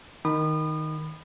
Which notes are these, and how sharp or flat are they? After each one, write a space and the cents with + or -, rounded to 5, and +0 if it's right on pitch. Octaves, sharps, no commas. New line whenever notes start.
D#3 +0 B5 +10 D#6 -35